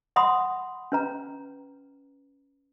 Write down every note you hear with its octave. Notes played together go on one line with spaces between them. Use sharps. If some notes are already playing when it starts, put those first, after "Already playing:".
F#5 B5 C6 D#6
C#4 B4 A#5